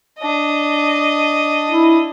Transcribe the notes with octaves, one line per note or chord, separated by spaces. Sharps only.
D4 D#5
E4